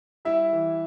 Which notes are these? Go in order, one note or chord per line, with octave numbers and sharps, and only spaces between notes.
G3 E4 E5
E3